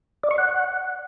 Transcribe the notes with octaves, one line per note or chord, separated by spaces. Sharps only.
D5
C#6
F#5